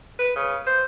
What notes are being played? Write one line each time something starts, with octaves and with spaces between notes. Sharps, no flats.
B4
C#3
C5